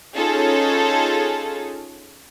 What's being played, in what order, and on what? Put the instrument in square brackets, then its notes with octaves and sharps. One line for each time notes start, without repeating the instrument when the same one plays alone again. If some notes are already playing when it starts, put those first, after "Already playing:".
[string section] C#4 D#4 F4 G#4 A4 C#5